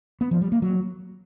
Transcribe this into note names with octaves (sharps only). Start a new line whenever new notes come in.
B3
F3
G3
A#3
F#3